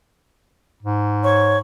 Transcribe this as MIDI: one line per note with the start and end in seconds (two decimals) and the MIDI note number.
0.83 1.60 44
1.24 1.58 73
1.24 1.58 85